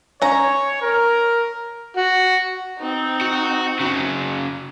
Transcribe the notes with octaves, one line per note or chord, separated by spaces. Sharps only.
C#4 C#5 A#5
A#4
F#4
C4 D#4
F#4
C#3 F#3